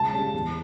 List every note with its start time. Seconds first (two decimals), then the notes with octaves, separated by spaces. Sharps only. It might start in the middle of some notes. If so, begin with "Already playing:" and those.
Already playing: C#2 A5
0.13 C#3 G3
0.33 E2